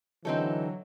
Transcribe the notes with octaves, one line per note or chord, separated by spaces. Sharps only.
D3 E3 F#3 C4 D#4 A4